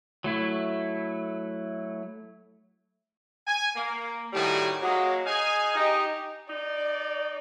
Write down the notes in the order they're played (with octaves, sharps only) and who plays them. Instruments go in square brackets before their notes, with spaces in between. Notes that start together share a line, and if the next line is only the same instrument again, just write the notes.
[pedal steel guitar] F#3 A3 E4
[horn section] G#5
A#3
A2 D#3 G3 F#4 G4 G#5
F#3 G#3 A#3
D#4 G#4 F5 G#5
D#4 G4
[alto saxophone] D#4 [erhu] D5